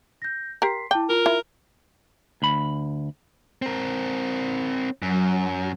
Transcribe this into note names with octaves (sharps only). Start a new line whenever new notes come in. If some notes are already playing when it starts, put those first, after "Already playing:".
G6 A#6
G4 A#4 C6 B6 C7
E4 G5 A5 D6
F4 A#4
E4
D2 B5
C4 A#4
F#2 F#3